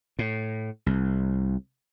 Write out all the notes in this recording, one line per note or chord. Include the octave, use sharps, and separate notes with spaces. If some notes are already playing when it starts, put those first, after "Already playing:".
A2
C2